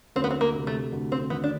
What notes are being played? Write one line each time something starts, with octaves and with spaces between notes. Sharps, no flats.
D2 C4
B3
C4
A#3
C3
A3
D2
C4
D#3 B3
D4